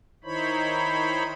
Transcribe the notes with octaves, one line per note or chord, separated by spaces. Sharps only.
D#3 D#4 E4 C5 C#5 B5